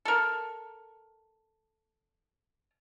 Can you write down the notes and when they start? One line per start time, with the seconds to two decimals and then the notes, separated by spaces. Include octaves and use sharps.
0.05 A4 A#4